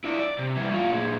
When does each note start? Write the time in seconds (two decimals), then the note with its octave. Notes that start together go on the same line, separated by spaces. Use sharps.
0.04 E4 D5
0.19 D5
0.39 C3
0.57 E3 G3
0.71 A2 F4
0.91 A#2 G#3